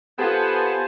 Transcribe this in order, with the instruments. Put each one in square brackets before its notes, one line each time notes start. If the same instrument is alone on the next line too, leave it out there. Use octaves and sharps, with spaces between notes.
[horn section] B3 [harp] F4 G4 [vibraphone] A4 [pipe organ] C5 G#5 A5